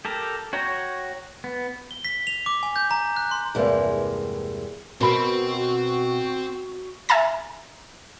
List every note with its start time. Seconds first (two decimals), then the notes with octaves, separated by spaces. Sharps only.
0.05 G4 A4 A#4
0.53 F#4 C#5 G5 A#5
1.44 B3
1.91 G7
2.05 B6
2.27 F7
2.46 D6
2.63 G#5
2.76 G6
2.91 A#5
3.17 F#6
3.31 C6
3.55 E2 G2 C3 G#3 A#3
5.01 B2 C4 F#4 A#4 C5 B5
7.09 E5 G#5 A#5 A6